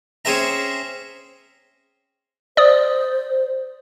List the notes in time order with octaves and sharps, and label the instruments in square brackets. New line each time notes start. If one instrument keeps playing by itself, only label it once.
[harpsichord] C4 C#4 G#4 C5 E5 A#5
[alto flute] C5 [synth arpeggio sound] D5 D#6